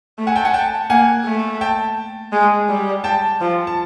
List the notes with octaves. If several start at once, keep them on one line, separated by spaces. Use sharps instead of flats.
A3
F#5 G#5
G5 A5
F#5 G#5
G5 A5
A#3 F#5 G#5
A3
G5 A5
G#3
G3
G5 A5
F3
A5